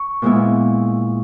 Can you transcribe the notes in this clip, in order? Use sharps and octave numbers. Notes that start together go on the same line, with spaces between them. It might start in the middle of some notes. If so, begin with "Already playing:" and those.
Already playing: C#6
A#2 G#3 B3 E4